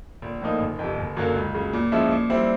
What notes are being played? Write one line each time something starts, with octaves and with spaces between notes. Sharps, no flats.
A#1
A2 F3 A#3 D#4
F#1
F2 C3
F#1
F#2 D3 F#3 A#3
C#2
C#3 F#3
A#2
F3 G#3 C#4 E4
A#2
G3 C4 E4